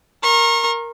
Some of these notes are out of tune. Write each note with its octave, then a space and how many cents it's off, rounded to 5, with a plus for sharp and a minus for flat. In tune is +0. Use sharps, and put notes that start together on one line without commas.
A#4 +0 C#6 -40